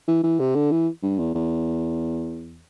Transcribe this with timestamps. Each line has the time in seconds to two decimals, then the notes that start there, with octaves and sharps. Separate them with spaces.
0.08 E3
0.24 E3
0.40 C3
0.55 D3
0.72 E3
1.03 G2
1.19 E2
1.35 E2